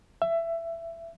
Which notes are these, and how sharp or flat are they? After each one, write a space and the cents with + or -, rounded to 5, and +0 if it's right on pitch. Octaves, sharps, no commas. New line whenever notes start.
E5 +20